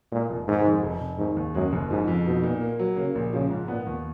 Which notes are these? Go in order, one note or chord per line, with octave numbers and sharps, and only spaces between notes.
A#2 G#3
F1
G#2 D#3
F2
F1
F1
G#2 D#3
D#2
F#2 G#3
F#1
G#2 F3
F2
B2 D#4
A#2
A#3
F#3
C#3 A#3
A#1
C#3 F3
G#2
A#2 B3
D#2